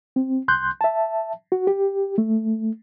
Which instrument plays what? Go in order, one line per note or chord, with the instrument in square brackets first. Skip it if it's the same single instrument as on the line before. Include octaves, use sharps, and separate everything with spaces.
[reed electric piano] C4
C2 C6 F#6 G6
E5 A5
F#4
G4
A3